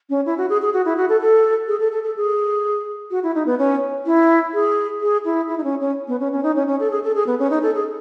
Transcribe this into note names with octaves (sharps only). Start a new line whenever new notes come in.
C#4
E4
F#4
G#4
G#4
F#4
E4
F#4
A4
A4
G#4
A4
A4
A4
G#4
F#4
E4
D#4
B3
C#4
E4
G#4
G#4
E4
E4
D#4
C#4
C#4
B3
C#4
C#4
D#4
C#4
C#4
A4
G#4
A4
G#4
B3
C#4
D#4
A4
G#4